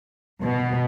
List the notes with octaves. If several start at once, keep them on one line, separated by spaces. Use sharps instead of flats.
B2